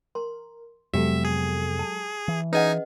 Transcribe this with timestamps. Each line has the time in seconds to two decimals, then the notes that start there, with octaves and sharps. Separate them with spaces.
0.15 A#4 C6
0.94 F2 C3 F#3 G#3 B3 G4 A4 E5
1.25 G#4
1.79 A5
2.28 E3
2.53 C#4 D#4 G#4 B4 D#5 F#5 G#5